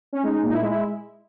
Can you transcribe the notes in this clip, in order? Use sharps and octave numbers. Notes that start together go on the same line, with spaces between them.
C#4
G#3 D#4
A#2
D#4
E4
G#3
E4